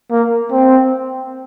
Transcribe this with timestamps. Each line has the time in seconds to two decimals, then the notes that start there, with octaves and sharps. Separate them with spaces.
0.11 A#3
0.52 C4